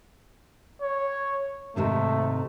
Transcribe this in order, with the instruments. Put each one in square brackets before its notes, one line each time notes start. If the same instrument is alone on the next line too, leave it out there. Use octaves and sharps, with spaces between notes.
[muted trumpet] C#5
[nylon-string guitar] G#2 C3 D#3 [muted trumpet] A3